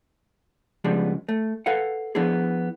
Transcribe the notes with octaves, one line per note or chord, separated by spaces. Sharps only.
C#3 F3 G3 G#3 B3 D4
A3
A4 B4 F5 F#5
F3 B3 D4 E4 G#4